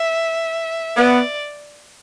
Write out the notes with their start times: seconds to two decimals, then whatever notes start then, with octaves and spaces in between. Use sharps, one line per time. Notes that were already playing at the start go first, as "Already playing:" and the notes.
Already playing: E5
0.96 B3 D5